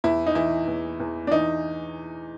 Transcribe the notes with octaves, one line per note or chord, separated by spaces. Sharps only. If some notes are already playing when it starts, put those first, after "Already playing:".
E2 E4
D#4
E3 E4
E2
E2
D4
E3 D#4